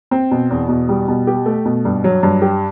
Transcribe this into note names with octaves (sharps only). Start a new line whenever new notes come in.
C4
B2
E2
B2
G3
B2
G4
A3
B2
G2
F#3
G2
G4